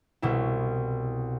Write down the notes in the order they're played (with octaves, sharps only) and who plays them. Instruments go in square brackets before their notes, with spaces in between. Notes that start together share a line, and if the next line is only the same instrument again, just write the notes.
[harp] C2 B2 E4